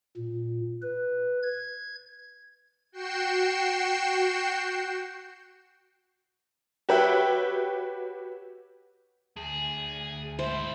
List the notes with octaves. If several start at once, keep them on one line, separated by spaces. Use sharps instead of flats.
A#2
B4
G#6
F#4 G5 C7 C#7 E7
F#4 G4 B4 C#5 E5 G5
D2 G#4
G#2 E4 C5 E5